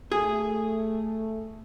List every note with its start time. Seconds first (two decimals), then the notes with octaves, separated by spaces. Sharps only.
0.12 A3 G#4